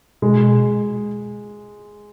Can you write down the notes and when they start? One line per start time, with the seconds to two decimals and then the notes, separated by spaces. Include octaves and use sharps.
0.22 B2 G#3